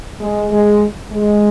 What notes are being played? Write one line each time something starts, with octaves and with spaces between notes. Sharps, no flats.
G#3
G#3
G#3